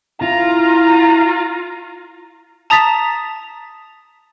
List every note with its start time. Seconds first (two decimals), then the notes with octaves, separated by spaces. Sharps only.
0.22 E4 F4 A#5
2.70 A5 A#5 D#6 A6 B6